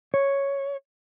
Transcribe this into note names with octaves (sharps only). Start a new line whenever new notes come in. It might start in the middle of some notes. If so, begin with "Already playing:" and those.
C#5